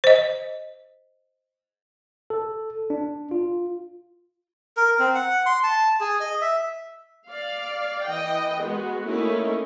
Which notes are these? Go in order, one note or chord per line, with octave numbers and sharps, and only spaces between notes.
C5 D#5
A4
D4
F4
A#4
C4
F#5
C6
A5
G#4
D#5
E5
D5 F5
E3 D#5 G5
G#3 B3 F#4
A3 A#3 C#4 D#4 E4